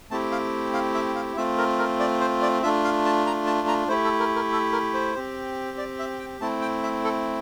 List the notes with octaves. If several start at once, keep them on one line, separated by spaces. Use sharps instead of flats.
A3 C4 E4 G4 A5
F5
F5
E5
F5
A3 C4 F4 E5
A#4
A#4
D5
C5
D5
A3 D4 F4 E5
F5
A5
A#5
A5
A#5
A3 E4 G4 C5
A4
A#4
A#4
A4
A#4
C5
C4 G4
D5
E5
G5
A3 C4 E4 A5
G5
E5
A4